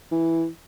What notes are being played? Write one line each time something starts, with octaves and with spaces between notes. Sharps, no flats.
E3